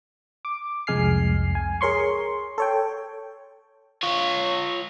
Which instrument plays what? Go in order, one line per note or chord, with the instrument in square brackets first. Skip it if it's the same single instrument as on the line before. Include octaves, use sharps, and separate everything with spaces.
[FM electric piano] D6
C2 F2 G#3 G#5 F6 C7
G#5
G#4 A#4 C#5 C6 C#6
A4 C#5 G5
[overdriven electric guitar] F4 C#5